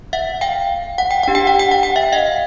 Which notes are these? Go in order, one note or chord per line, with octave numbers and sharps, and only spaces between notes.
E5 F#5
F5 G5
F#5
G5
D4 G4 F#5
G5
F#5
G5
F#5
G5
E5 F#5
D#5 F5